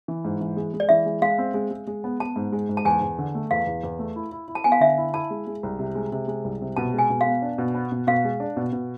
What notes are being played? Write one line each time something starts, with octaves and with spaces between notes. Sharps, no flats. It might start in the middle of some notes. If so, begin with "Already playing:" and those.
E3
G#2
E3
G#3
G#3
D5
E3 E5
G#3
G#3 F5
C4
G#3
G#3
G#3
B3
B3 A5
G#2
G#3
G#2
A5
E2 G#5
E2
D3
A3
E2 F5
E2
E2
A3
E4
E4
E4
A5
B3 G#5
F5
D3 E5
E4
E4 A5
G#3
G#3
C2
C3
G#3
C3
G#3
C2
C3
B2 A5
G#3
G#5
B2
F5
B3
D4
B2
B3
B2
B2 F5
G#3
D4
B2
B2